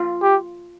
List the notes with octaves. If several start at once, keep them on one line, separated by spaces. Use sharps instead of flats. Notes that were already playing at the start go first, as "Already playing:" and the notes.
Already playing: F4
G4